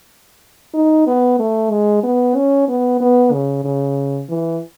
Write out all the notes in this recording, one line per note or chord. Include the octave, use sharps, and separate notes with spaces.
D#4
B3
A3
G#3
B3
C#4
B3
B3
C#3
C#3
E3